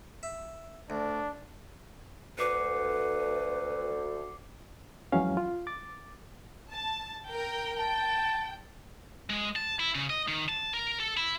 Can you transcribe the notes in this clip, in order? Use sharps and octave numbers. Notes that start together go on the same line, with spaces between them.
E5
D2 D4
D2 B4 D6 C7 C#7
F2 E3 F#3 G#3 C#4 F5
F4
D6 A6
A5
A#4 G5
G5 A5
G#3
A5
E4
C#3
D#5
D#3
A5
A#4
A4
E4